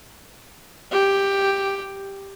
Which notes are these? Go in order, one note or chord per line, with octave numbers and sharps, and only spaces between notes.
G4